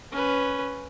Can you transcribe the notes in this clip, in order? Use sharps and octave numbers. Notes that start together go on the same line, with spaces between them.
C#4 B4